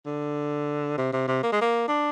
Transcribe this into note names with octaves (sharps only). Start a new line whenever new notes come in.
D3
C3
C3
C3
A#3
G#3
A#3
D4